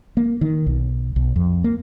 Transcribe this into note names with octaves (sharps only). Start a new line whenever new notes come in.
A#3
D#3
B1
B1
F2
A#3